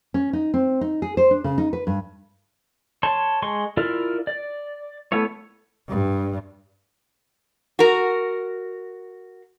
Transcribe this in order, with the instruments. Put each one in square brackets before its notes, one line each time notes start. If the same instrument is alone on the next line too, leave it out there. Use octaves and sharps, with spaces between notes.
[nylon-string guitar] C#4
D#4
C4
D#4
G#4
C5
D4
C#3
D#4
B4
G2
[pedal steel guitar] C#5 A5 C6
G#3 C6 C#6
E4 F4 A#4 D5
D5
A3 B3 E4 C#5
[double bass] G2
[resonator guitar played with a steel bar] F#4 A#4